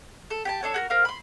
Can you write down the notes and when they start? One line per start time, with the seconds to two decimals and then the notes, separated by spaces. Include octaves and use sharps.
0.30 A4
0.45 G4 G5 A5
0.63 D4 A4 C#5
0.74 F#4 G#4 A#4
0.90 A#4 C5 F5
1.05 B5 C6